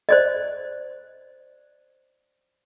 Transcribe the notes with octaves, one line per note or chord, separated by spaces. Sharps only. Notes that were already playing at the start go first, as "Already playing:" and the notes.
C5 D5 D#5